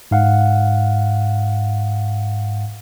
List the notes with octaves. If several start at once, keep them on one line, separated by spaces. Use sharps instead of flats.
G#2 F5 F#5